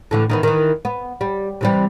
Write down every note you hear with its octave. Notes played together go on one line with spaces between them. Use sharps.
A2 D3 E3
D#3 E3 B3
D#3 E3
B3
G3
C3 E3 G3